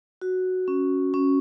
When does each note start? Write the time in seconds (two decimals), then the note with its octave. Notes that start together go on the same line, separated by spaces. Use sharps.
0.22 F#4
0.68 C#4
1.14 C#4